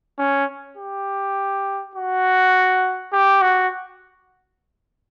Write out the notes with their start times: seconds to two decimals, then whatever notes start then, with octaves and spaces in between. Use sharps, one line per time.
0.19 C#4
0.77 G4
1.96 F#4
3.13 G4
3.42 F#4